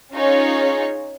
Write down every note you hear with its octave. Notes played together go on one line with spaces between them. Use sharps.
C#4 D#4 F4 G#4 C#5